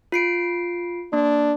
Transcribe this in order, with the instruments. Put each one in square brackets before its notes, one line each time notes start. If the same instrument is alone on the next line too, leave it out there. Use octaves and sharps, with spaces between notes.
[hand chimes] F4 C7 D7
[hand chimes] A#3 [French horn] D4